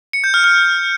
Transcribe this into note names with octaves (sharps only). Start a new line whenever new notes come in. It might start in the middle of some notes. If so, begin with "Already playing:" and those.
C#7
G6
F6
F6